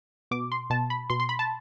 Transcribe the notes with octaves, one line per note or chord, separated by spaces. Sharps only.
B2 D6
C6
B2 A5
B5
B2 C6
C6
B5
A5